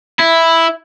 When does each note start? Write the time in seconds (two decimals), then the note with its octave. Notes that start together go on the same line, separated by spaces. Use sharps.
0.20 E4